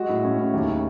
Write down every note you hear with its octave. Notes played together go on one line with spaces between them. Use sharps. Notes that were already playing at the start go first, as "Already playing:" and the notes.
Already playing: G#3 F#4
A2
A2 C#4
A2 C#4
D#2
C#3